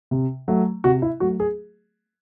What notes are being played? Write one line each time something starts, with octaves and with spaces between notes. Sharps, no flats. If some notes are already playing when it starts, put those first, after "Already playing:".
C3
F#3 A3
C3 F#4
E4
F#3 A3 F#4
G#4